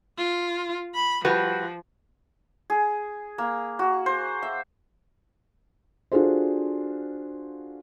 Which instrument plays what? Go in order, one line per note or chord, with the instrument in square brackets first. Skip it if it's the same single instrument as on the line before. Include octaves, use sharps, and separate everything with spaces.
[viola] F4
B5
[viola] F3 [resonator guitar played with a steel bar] G3 F#4 B4
[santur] G#4
A#3
F#4
C5
E5
[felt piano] D4 F4 F#4 G#4 A4 C5